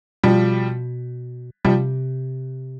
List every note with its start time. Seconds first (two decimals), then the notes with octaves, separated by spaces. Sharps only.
0.23 B2 F3 G3
1.65 C3 F3 G3